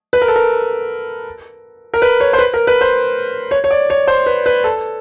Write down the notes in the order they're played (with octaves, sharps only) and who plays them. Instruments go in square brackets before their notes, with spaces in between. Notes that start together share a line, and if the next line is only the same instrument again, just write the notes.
[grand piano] B4
A#4
A4
A#4
A#4
B4
C#5
C5
B4
A#4
B4
C5
C#5
C#5
D5
C#5
C5
B4
B4
A4